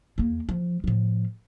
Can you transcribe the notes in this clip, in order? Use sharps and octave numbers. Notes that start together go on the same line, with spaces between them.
E2 A#3
F3
A2 F3